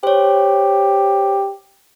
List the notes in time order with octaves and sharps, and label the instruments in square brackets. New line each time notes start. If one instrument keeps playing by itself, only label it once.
[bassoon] G4 [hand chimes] C5 C#5